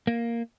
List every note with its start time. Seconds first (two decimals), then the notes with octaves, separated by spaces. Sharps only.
0.07 A#3